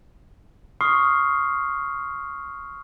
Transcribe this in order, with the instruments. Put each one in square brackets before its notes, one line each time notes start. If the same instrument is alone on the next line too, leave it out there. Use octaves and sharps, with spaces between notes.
[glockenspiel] C6 C#6 D#6 F6 C7